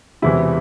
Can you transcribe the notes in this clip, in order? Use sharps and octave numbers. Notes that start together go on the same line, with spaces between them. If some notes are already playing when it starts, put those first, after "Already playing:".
E1 E2 C3 E3 E4